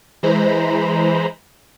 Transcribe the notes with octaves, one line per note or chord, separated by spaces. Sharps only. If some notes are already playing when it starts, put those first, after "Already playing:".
E3 G#3 C5 A#5 B5